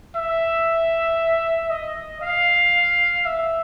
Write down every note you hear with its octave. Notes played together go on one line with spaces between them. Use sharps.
E5
D#5
F5
E5